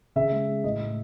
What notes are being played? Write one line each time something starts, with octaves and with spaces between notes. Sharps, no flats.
C#3 E5
G#3
G#3
A2 D#5
A2